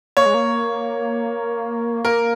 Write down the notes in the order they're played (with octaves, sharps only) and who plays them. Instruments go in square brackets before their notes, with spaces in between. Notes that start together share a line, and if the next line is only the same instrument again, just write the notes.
[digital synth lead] A#3 [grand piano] C#5
[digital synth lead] G#3
A#3
[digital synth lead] A#3 [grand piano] A#4